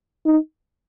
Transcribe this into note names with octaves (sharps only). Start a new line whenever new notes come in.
D#4